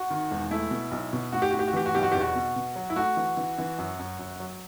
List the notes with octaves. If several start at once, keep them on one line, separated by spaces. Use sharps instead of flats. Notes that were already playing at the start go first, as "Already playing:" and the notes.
Already playing: F#4
D#3
E1
A3 E4
B2
B1
B2
A2 F#4
G4
A2 F#4
G4
F#4
E3 G4
F#4
B1 G4
F#4
E2 G4
F#4
B2
B2
F#3
E4
A3 F#4
E3
E3
E3
F#2
F#2
F#2
F#3